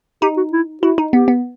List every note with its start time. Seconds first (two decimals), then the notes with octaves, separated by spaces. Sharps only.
0.22 D#4 G4
0.37 F#4
0.52 E4
0.82 E4 F#4
0.98 D#4
1.12 B3 G4
1.28 B3